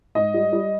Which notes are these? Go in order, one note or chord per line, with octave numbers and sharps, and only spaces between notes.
G#2 D#5
G3
G3